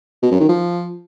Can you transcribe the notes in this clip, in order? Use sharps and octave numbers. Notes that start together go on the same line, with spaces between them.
B2
F#2
D#3
F3